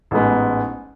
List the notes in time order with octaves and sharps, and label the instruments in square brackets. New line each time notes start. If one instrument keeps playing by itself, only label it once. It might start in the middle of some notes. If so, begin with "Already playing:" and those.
[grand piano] A1 G#2 G#3 B3